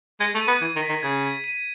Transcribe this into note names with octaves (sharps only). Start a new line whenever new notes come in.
G#3 G#6
A3
D#7
B3
E3 G#6
D#3
B6
D#3
C#3 G#6
G#6
D#7